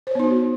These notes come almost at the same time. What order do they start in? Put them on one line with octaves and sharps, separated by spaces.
C5 C#5 B3 D#4 F#4